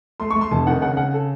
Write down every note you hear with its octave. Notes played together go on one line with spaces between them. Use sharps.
A3 C6
C#6
A3
C6
F1 A5
D#3 F#5
C#3 F#5
C#3 F#5
A4